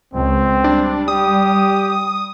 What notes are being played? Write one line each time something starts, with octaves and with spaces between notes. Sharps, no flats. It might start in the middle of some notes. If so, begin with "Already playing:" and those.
C#2 C4
G3 D4
G4 D#6